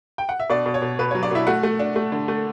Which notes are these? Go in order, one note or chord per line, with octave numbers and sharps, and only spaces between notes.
G5
F#5
E5
B2 D4 D5
B2
C#5
B2
B2 B4
F#3 C#5
D4 D5
B2 E4 E5
A3 F#4 F#5
A3
D4
A3
D3
A3